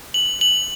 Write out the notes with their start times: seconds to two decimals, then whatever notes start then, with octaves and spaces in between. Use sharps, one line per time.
0.14 F#7
0.41 F#7